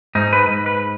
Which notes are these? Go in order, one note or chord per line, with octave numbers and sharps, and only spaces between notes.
G#2 D#4
B4
G#2
B4